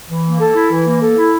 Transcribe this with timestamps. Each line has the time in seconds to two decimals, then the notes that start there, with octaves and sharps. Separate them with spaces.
0.09 E3
0.24 A#3
0.40 A4
0.55 E4
0.71 E3
0.87 A#3
1.02 A4
1.17 E4